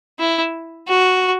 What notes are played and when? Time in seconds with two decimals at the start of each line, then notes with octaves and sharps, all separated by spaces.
0.19 E4
0.88 F#4